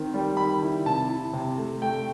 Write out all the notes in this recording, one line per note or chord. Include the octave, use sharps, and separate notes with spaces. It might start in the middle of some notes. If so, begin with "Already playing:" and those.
Already playing: D#3 C4
G3
D#3 B5
E4
C3 A5
E4
C3
A3
A3 G5